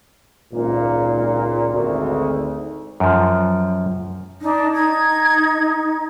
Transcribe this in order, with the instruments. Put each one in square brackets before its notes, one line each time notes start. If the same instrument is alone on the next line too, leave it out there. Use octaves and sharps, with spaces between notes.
[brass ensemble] G#1 C#2 A#2
G#1 D2
[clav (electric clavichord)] F#2 F3
[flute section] D4 [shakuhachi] D#4
[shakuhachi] D#4 [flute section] G#6